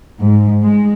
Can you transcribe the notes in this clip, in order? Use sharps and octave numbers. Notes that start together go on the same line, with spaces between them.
G#2
G#3